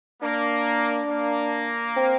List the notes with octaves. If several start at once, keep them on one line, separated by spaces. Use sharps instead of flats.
A#3 D4
A#3
C4